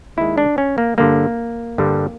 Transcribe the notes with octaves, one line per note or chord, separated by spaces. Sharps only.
D#2 D#3 G#3 E4
D4
C#4
A#3
G2 D3 G3 A#3
G2 D3 G3